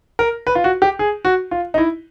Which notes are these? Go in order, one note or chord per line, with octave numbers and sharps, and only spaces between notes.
A#4
B4
F4
F#4
G4
G#4
F#4
F4
D#4
E4